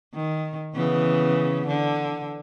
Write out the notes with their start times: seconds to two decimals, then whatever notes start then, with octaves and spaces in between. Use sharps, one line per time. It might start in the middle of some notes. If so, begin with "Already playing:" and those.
0.14 D#3
0.74 C#3 E3 B3
1.67 D3